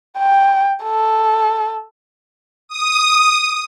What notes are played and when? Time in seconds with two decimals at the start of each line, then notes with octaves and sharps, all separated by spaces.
0.18 G5
0.83 A4
2.68 D#6